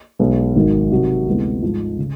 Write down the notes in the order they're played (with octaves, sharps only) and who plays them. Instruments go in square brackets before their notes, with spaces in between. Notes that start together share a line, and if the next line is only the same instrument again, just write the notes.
[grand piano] B1 B2 G#3 B3
G#1 G#2 D#3 F#3
C3 D#3 F#3
D2 C3 E3 G#3 B3
G#2 F3 G#3
C#3